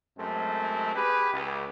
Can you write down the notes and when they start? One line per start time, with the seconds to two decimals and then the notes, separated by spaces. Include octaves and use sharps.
0.17 F#2 G#3 A3 C4
0.93 G4 G#4 B4
1.32 C#2